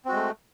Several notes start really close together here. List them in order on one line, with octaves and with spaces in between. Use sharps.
C4 F#4 G#3 A3